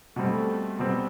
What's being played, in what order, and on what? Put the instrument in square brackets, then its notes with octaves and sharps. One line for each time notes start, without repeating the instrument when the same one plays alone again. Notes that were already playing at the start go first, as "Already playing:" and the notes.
[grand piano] B2 G3 C4 [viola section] A3
[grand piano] B2 G3 C4 [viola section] B3